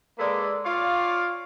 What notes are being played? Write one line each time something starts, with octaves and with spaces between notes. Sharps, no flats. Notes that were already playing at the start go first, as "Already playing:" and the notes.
G#3 A#3 A4 B4 D5
F4 C#5 D5 F5